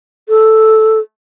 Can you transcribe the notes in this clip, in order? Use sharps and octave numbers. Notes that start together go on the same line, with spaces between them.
A4